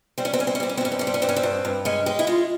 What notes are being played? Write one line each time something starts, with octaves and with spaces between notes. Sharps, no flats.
G3 C4
C#4
C4
G3 C#4
C4
C#4
G3 C4
C#4
C4
G2 C#4
C4
G3 C#4
C4
C#4
G2 C4
C#4
C4
G2
G2
G#3 C#4
G#3 G4
E4
G#3 F4